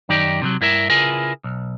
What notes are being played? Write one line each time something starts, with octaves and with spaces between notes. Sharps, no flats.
F#2 D#3 D#4 G4 D5
C3 D#3 F#3
G2 E4 A#4 E5
C#3 E4 F4 G#4 A#4 B4
B1